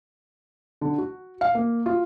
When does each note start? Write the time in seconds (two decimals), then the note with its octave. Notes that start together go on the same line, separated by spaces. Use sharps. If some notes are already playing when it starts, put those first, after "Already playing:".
0.81 D3
0.98 F#4
1.41 F5
1.55 A#3
1.86 F4